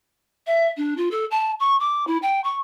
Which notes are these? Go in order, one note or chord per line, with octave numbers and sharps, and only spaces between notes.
E5
D4
F4
A4
A5
C#6
D6
E4
G5
C#6